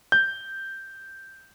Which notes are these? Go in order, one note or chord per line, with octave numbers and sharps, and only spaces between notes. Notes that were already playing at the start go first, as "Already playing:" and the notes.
G6